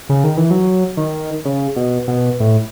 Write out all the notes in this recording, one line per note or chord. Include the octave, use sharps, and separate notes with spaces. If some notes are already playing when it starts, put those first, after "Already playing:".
C#3
D#3
E3
F#3
D#3
C#3
B2
B2
A2